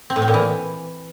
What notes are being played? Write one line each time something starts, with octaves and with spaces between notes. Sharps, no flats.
C4
A2
C4
A#2
E3